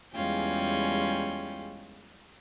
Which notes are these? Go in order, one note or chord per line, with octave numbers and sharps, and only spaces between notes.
E2 G3 G#3 C#4 F4 G5